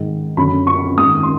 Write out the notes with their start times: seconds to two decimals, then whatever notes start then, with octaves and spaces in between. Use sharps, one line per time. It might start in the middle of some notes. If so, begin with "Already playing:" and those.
Already playing: G#2 D#3
0.37 F#2 D3 B5
0.67 C#6
0.97 G#2 D#3 D#6
1.23 C6